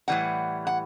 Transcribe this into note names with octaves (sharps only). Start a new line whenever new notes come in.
A2 E3 G3 F#5
F#5